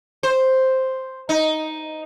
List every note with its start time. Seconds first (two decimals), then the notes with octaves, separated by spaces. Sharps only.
0.23 C5
1.29 D#4